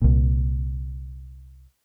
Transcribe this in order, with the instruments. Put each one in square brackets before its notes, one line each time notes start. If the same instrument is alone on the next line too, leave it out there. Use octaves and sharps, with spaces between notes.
[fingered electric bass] C2 A#2